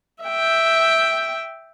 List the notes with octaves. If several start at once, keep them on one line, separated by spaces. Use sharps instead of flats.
E5 G5